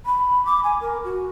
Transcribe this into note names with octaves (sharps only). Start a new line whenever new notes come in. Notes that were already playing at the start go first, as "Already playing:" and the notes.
B5
D6
G#5
A#4
F#4